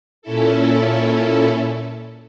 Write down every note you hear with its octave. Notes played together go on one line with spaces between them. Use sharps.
A#2 C#4 E4 A4